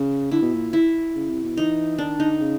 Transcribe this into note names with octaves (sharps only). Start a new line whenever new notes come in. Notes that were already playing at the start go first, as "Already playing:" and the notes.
Already playing: C#3
D3 E4
B2
A#2
E4
C#3
C3
B2
E3 D#4
D#3 D4
D3 D#4
C#3